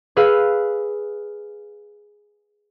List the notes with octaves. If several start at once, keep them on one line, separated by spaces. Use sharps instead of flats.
G#4 B4 F5 E6 F6